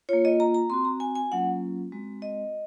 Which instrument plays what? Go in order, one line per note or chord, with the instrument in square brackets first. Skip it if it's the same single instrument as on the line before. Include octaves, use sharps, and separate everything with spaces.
[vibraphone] A#3 F4 C#5
D#5
A#5
A#5
C4 F#4 C6
A#5
G#5
G#5
F#3 A#3 C#4 F4 F#5
G#3 C4 F#4
D#5